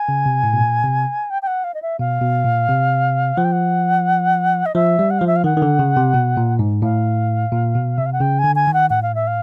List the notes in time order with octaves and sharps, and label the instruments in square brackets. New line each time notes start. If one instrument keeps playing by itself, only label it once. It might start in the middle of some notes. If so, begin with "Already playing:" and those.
Already playing: [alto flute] G#5
[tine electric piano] C#3
C3
A2
B2
A#2
C3
[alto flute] G5
G5
F#5
F5
D#5
E5
[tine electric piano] B2 [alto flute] F5
[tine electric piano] B2
A#2
C3
[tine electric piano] F3 [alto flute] F#5
[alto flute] G5
F#5
D#5
[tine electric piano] F3 [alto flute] E5
[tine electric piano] G3
[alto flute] F#5
[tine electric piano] F3 [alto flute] F5
[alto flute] E5
F5
[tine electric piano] D#3 [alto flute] F#5
[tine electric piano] D#3
D3
C#3
C3
B2
A#2
G#2
[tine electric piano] A2 [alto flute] F5
[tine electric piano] A#2
B2
[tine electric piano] C3 [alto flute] E5
[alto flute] F5
F#5
[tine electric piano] C#3 [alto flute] G5
[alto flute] G#5
[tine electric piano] D3
[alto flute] G#5
[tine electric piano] D#3
[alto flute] F#5
[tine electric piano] A2 [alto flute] F#5
[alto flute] F5
E5
F5